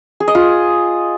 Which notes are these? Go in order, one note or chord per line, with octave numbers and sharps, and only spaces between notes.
G#4
D#5
F4